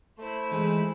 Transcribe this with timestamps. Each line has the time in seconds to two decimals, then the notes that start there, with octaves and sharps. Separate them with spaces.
0.18 A3 E4 C5
0.51 E3 G#3 D#4